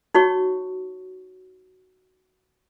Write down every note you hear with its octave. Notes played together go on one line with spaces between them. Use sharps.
D#4 F#4 C#5 C#6